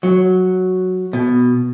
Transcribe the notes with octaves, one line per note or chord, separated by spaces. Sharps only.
F#3
B2